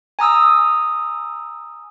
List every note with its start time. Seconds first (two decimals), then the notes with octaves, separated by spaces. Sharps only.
0.19 G#5 A#5 D#6 E6